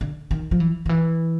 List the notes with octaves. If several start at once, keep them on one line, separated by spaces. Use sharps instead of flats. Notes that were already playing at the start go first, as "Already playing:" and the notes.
D3
D#3
F3
E3
D#3
E3